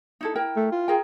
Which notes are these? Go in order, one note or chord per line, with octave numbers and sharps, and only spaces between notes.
D#4 E4 A4
E4 A#4 G5
A3
F4
G#4 A#4 G5